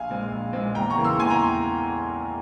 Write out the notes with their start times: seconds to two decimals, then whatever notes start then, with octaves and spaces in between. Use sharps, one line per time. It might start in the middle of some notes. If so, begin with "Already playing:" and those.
Already playing: A#1 F5 G#5
0.10 A#2 G#3 C4
0.32 A#1
0.53 A#2 G#3 C4
0.75 E2 G5 A#5
0.90 A#5 C#6
0.98 C#3 E3 A#3
1.04 C6 E6
1.19 E2 G#5 C6
1.30 G5 A#5